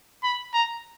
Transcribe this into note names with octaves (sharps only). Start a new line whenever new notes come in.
B5
A#5